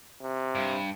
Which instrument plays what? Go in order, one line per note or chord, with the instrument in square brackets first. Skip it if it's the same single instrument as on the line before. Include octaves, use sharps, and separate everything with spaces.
[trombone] C3
[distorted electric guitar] G2